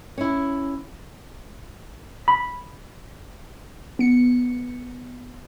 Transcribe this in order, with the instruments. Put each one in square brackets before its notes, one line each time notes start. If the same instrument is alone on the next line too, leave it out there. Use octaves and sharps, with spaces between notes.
[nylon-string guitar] C#4 E4
[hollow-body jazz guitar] B5
[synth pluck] B3 C#7